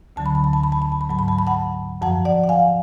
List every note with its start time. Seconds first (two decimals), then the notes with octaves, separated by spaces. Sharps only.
0.16 D2 D3 F#3 A5
0.26 B5
0.35 A5
0.44 B5
0.53 A5
0.63 B5
0.72 A5
0.82 B5
0.92 A5
1.01 B5
1.09 G#2 F#3 A5
1.19 B5
1.28 A5
1.39 B5
1.47 F#5 A5
2.02 F#2 F3 F#5 A5
2.25 D5 F#5
2.44 F#5
2.49 F5 G#5